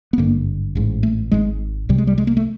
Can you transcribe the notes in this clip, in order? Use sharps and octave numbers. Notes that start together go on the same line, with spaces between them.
B3
G#1 G2 D3 A#3
A1 G#2
A3
G#1 G#2 G#3
C2 C3 G3
G#3
G3
G#3
A#3
A3